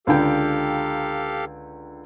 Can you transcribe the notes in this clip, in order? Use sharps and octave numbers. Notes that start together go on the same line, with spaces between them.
C#2 D3 G4 A4 F5 G5